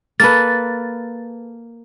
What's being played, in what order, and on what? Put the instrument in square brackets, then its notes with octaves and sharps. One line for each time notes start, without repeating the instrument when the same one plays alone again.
[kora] A#3 A4 B4 [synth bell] A6